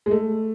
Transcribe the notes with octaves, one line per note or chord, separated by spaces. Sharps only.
G#3
A3